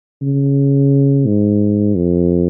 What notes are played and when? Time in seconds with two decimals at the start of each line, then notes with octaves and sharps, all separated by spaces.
0.22 C#3
1.26 G#2
1.96 F2